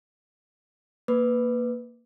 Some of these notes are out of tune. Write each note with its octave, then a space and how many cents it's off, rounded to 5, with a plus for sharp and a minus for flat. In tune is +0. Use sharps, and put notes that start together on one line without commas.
A#3 +0 B4 +5 D6 +0